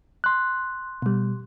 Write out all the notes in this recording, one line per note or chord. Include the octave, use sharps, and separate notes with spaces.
C6 F#6
B2 G3